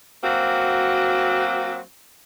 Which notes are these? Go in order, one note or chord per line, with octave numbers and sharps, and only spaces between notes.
F#3 A#3 C4 F#4